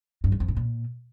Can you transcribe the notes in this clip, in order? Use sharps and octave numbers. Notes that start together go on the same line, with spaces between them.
G2
F#2
F2
A2
A#2